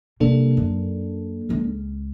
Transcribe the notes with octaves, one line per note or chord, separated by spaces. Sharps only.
C3 G3 A#3 D4 A4
F#2
C#2 C#4